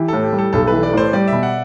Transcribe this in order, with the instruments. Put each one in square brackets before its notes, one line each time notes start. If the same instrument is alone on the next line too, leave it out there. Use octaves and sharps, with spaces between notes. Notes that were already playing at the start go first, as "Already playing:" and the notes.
Already playing: [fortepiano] E3 [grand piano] G4
[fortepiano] A2 [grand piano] A4
[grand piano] G4
[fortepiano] G3
[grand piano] A4
[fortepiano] B1 [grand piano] A4
[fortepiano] E3 [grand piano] B4
[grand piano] D5
[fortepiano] A2 [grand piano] C5
[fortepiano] G3 [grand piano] D5
[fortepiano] B2 [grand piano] E5
[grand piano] F#5